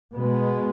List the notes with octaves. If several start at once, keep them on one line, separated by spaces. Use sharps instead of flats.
B2 G#3 B3